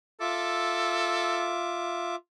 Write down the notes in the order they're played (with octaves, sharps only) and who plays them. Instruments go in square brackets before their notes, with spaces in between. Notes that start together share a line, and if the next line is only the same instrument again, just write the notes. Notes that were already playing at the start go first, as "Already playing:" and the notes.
[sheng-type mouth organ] F4 E5 D6 [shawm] A4